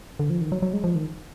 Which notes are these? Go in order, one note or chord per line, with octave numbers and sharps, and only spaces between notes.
D3
F3
D#3
F#3
F#3
G#3
F3
D#3